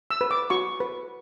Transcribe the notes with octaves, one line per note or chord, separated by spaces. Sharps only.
E6
B4
D6
F#4 C#6
B4